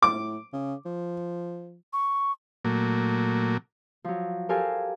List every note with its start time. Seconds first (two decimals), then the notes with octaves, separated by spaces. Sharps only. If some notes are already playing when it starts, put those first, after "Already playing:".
0.03 A2 D6
0.53 C#3
0.85 F3
1.93 C#6
2.65 A#2 F#3 A3 A#3
4.04 F3 F#3
4.49 G4 A4 A#4 C5 F5 G#5